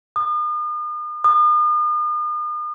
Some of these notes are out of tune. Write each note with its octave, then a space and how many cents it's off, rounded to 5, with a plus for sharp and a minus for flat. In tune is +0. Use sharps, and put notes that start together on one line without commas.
D#6 -45
D#6 -45